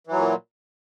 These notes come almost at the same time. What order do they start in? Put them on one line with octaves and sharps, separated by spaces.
E3 F#3 A#2